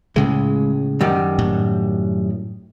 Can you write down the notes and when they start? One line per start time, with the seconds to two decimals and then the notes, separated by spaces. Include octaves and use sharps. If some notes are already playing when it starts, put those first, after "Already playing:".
0.16 C#2 A2 C#3 G#3
1.01 F#2 D#3 G3
1.39 A2